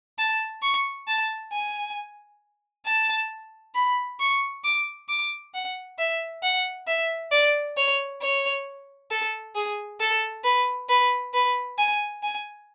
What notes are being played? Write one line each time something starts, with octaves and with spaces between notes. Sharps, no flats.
A5
C#6
A5
G#5
A5
B5
C#6
D6
D6
F#5
E5
F#5
E5
D5
C#5
C#5
A4
G#4
A4
B4
B4
B4
G#5
G#5